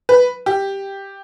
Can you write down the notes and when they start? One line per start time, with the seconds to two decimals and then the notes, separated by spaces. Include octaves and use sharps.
0.09 B4
0.46 G4